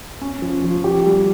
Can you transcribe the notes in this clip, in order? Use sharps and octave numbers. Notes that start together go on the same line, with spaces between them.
C#4
F3
F3
G4
G3